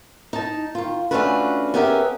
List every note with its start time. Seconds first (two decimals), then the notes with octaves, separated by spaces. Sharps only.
0.33 D#4 A5
0.75 D#3 F4
1.11 A3 C#4 D4 F4 F#4 B4
1.74 B3 C#4 G4 G#4 A#4 E5